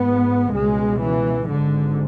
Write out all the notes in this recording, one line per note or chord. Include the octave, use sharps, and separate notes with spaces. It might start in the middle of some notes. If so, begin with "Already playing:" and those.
Already playing: G#1 G#2 B3
C#2 B2 G#3
E3
G#1 G#2 D3